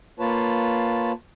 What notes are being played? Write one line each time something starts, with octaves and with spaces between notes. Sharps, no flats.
A#3 F4 B4 C#5 A5